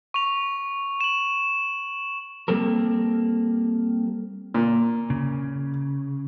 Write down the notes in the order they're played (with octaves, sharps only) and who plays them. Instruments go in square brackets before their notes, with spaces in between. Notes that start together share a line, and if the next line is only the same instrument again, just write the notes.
[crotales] C#6 F7
E7 F#7
[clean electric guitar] G3 A#3 C4 A4 A#4
[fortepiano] A#2
[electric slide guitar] C#3